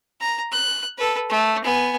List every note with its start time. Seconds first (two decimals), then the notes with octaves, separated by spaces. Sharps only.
0.21 A#5
0.52 F#6
0.98 A4 B4
1.29 A3
1.64 B3 G#5